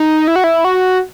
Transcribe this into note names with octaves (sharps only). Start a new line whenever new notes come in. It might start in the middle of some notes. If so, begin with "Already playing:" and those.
Already playing: D#4
E4
F#4
E4
F#4